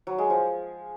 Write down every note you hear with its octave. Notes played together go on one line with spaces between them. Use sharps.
F#3
G#3
F3